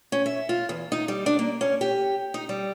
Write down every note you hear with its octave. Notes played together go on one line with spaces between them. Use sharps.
C#4
E5
F4
E2
D#4
G3
D4
A#3
C#4
G4
D#4
G3